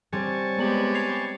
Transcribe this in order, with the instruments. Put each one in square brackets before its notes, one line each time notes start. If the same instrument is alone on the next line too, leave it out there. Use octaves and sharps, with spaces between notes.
[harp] G3 C4 C#5 [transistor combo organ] G#5 A5 C#6
[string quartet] G#3 G4 B4 [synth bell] B3 D5 F#7
[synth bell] G#6 C7 F7